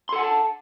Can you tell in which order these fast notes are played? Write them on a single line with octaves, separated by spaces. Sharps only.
C6 A4 F#5 G#5 A5